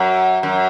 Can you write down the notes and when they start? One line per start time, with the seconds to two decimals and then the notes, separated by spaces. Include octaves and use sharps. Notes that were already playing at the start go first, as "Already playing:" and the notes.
Already playing: F#2
0.43 F#2